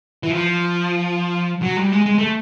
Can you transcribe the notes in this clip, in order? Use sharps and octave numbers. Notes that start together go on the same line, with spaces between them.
E3
F3
F#3
G3
G#3
G#3
A3